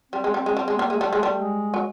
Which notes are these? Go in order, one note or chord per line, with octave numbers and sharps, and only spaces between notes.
G3 C4
G#3
G3 C4
G#3
G3 C4
G#3
G3 A#3
G#3
G3 A3
G#3
G3
G#3
F#3